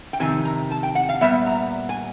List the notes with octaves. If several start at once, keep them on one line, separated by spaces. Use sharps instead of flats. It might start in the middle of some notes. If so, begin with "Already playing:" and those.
G5
F2 C3 D#3 G#5
A#5
A5
G5
F#5
F5
A#2 G3 B3 E5
A#5
G#5